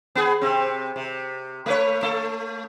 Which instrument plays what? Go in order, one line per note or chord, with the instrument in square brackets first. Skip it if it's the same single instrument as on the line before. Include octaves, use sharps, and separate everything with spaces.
[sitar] B3 G#4
C3 C4
C3
A3 B4 C#5
A3 A4